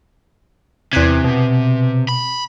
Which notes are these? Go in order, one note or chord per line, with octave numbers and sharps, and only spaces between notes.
E2 C3 F#6 G#6
B2
B5